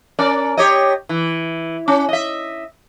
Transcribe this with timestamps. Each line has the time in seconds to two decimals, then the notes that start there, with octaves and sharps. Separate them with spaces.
0.19 C#4 A#4 D5
0.57 G4 C#5 D#5
1.09 E3
1.88 C#4
2.09 D#5 E5